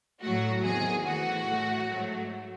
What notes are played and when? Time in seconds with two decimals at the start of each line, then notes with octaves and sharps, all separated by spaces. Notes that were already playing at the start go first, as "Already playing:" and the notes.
0.22 A2 F#3 A3 F#4
0.63 E2 C3 D#3 G#4
1.04 C3 E3 A3 F#4
1.46 A2 F#3 A3
1.89 G#2 F#3 A3